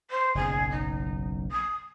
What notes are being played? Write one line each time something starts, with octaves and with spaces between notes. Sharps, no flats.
C5
F#1 B1 G#4
D#4
D#6